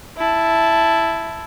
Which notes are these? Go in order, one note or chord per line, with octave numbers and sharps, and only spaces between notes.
E4 A5